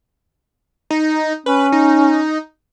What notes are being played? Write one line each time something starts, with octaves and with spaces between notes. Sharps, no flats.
D#4
C#4 B4
D#4